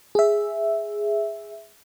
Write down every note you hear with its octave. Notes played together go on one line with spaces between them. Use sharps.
G#4 E5